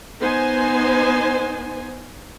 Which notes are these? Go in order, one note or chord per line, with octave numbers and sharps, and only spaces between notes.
B3 D#4 C5 G#5